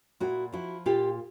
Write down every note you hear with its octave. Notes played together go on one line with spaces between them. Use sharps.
A#2 E4 F#4
F3 E4 F#4
A#2 F4 G4